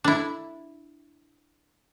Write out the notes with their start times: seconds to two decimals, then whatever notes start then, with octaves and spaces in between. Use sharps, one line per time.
0.04 D4 E4